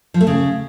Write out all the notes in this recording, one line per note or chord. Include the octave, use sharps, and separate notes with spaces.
F3
A3
C#3